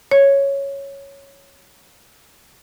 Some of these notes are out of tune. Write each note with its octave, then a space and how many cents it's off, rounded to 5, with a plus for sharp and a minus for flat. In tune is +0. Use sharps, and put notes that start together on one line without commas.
C#5 +0